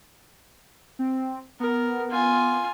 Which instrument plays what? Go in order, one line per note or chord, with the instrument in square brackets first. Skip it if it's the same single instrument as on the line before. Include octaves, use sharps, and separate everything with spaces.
[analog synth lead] C4
[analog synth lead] B3 [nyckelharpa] A#4
[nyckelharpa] F4 G#5